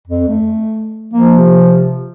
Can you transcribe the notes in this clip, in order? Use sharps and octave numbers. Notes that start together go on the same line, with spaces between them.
F2
A3
F3 A#3
C3